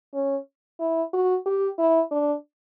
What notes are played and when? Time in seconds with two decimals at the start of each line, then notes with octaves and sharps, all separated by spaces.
0.14 C#4
0.80 E4
1.13 F#4
1.46 G4
1.78 E4
2.11 D4